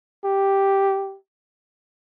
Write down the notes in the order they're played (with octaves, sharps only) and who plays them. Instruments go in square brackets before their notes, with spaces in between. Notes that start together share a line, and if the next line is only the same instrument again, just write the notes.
[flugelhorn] G4